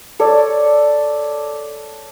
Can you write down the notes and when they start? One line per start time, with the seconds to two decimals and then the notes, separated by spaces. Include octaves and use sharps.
0.20 A4 C#5 D5